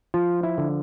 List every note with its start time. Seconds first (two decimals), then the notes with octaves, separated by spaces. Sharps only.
0.14 F3 F4
0.43 E4
0.58 D3